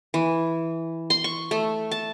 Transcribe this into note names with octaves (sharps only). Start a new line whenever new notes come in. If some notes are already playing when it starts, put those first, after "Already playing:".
E3
C6
C#6
A3
A5